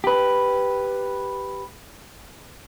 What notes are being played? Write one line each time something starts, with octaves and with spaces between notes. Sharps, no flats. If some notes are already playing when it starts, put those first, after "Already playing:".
G4 B4